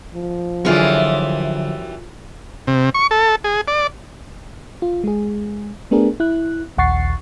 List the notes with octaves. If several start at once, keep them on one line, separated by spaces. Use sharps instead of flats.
F3
F#2 D3 E3 F#3 G3 F4 G#4 C#6
C3
C#6
A4
G#4
D5
F4
G#3 G#4
A3 B3 D4 G#4 A#4
E4 F#6
A#1 D#2 F#5 C#6 A6 C7